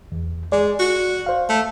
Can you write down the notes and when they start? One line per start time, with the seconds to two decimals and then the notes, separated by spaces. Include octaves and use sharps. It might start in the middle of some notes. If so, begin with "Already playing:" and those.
0.12 E2
0.52 G#3 D5
0.79 F#4
1.26 C5 F5
1.49 A3